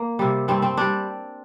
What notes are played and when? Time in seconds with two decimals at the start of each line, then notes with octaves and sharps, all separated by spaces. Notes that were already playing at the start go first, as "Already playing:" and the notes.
Already playing: A#3
0.19 C3 G3
0.48 G2 G3 C4
0.62 C4
0.77 G3 D4